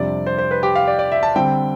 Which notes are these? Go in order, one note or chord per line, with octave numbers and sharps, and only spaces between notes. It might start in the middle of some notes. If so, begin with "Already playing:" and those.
Already playing: F2 C3 G3 D4 D5
C5
C5
B4
G4
F5
D5
D5
E5
A5
D3 G3 C4 G5